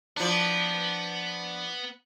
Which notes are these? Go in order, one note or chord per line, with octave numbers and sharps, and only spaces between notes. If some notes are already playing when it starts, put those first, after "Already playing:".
F3 B3 D4 B4